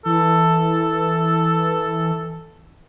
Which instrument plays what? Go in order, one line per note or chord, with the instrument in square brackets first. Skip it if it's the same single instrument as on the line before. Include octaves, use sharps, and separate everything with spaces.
[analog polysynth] E3 [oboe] A4